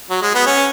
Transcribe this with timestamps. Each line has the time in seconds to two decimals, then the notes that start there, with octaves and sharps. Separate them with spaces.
0.10 F#3
0.22 G#3
0.34 B3
0.46 C#4